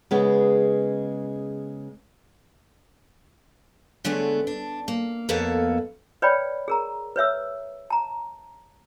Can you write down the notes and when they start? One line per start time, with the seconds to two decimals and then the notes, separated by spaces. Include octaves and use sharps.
0.11 C#3 G#3 B3
4.04 D3 G#3 A3 B3 C#5
4.47 D4
4.88 A#3
5.29 F2 A#3 B3 A4 C#5 F5
6.22 B4 C#5 D5 G5 B5
6.68 G#4 A#4 A#5
7.16 B4 C#5 E5 E6
7.90 A5 A#5